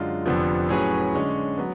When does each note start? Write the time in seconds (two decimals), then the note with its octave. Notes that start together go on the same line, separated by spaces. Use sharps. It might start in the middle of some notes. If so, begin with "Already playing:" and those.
Already playing: F#2 D3 G#3 D4 F4
0.26 F1 F2 D3 F3 B3
0.69 A2 F#3 C#4 G#4 B4
1.14 D3 G#3 C#4
1.58 F#3 B3